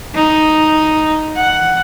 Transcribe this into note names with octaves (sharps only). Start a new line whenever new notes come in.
D#4
F#5